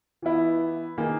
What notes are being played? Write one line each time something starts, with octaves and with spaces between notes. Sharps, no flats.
E3 B3 E4
D#3 A#3 D#4 G#4